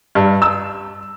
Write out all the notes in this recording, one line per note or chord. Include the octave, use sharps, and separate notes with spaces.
G2
E6